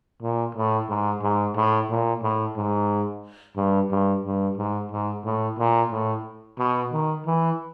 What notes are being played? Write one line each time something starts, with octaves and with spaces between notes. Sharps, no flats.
A#2
A2
G#2
G#2
A2
A#2
A2
G#2
G2
G2
G2
G#2
G#2
A2
A#2
A2
B2
D#3
E3